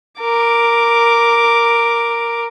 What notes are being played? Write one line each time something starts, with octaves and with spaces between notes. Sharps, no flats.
A#4 D6